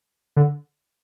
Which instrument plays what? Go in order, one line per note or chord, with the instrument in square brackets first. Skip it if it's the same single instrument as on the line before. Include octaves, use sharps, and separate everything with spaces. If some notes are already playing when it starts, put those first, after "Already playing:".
[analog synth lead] D3